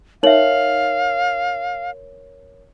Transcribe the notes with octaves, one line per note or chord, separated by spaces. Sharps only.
D#4 A#4 C#5 E5 F5 F#7